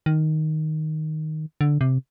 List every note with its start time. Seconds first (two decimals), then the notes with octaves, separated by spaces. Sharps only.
0.06 D#3
1.61 D3
1.81 C3